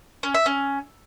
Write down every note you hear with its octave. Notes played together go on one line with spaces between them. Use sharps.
C#4
E5
C#4